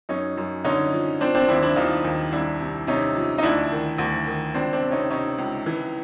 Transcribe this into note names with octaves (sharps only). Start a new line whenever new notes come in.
F#2 C#4 D#4
F#2
D3 C#4 D#4
F3
F3 C4 D4
C4 D4
D#2 D4 E4
D4 E4
D#2 D#4 F4
D#2
C2 D4 E4
C3
C3 C#4 D#4
F3
D#4
D2 D4 E4
D#3
D2
D#3
C#2 C4 D4
C4 D4
C3
C#4 D#4
C3 C#4 D#4
C#2
E3